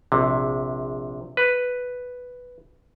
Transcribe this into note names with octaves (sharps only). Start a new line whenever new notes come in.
A#1 C3
B4